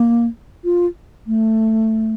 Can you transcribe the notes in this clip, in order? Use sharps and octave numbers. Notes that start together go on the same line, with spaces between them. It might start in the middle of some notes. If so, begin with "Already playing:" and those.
Already playing: A#3
F4
A3